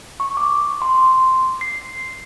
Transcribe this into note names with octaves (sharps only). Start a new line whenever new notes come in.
C#6
D6
C6
C7